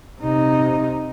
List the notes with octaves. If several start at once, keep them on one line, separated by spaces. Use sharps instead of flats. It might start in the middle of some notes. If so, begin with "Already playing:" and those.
C3 D#4